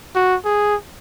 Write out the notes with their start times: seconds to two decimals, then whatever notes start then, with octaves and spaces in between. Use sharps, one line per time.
0.15 F#4
0.45 G#4